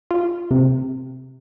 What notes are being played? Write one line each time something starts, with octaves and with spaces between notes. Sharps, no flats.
F4
C3